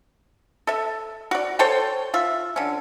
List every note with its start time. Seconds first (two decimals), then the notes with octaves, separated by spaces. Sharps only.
0.67 A4 E5
1.31 F#4 D5
1.59 A4 C5 C#5 G5
2.14 F4 E5
2.56 D3 C#4